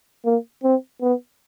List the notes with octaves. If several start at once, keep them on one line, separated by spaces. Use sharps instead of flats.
A#3
C4
B3